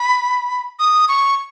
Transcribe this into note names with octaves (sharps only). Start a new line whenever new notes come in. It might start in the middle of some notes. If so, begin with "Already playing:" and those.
Already playing: B5
D#6
C#6